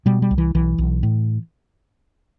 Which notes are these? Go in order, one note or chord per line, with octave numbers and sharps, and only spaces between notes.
B2 G3
G3
C2
E3
B1 E3
B1
A2